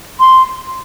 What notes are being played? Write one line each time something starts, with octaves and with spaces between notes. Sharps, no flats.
C6